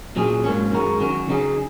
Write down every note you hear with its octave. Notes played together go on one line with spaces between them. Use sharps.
A#2 F#3 C#4 G#4
G#2 F#3 A#3 C#4
F#2 D#3 G#3 F#4 A#4
D#3 F#3 C#4 F#4
C#3 F#3 D#4 G#4